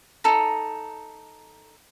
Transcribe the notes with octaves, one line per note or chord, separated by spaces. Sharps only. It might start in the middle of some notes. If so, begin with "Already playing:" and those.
D#4 A4 A#5